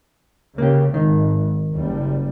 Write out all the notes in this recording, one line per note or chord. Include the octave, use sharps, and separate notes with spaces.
C#3 A#3 G4
G#1 D#3
F#1 G3